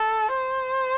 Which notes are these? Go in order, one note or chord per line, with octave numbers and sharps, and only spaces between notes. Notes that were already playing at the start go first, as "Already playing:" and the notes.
Already playing: A4
C5